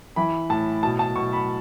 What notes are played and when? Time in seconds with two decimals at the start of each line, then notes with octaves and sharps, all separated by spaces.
0.16 E3 B5
0.50 A2 A5
0.83 B2 A5
0.99 A5
1.16 B2 C#6
1.33 B5